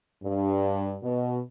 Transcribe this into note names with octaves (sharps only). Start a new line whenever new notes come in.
G2
B2